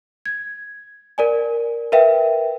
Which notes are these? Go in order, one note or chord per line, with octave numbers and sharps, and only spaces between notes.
G#6
A#4 D5 G#5
A#4 B4 E5 F5 G5